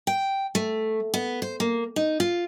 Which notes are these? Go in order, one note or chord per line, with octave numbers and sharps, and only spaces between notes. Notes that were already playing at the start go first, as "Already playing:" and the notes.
G5
A3
B3
C5
A#3
D#4
F4